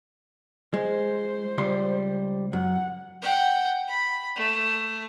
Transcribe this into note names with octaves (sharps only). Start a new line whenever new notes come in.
G#3 C5
C#2 G3 C6
F#2 F#5
F#5 G5
B5
A3